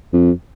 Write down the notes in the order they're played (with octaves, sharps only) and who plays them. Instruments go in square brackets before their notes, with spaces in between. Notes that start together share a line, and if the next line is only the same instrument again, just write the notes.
[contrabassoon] F2